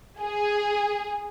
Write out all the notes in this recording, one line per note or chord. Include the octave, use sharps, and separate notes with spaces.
G#4